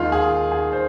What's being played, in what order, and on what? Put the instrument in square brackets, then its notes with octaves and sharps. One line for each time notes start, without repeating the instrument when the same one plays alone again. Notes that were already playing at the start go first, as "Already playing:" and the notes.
Already playing: [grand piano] D#2 D#3 G#3 F4
G#4
G#4
C5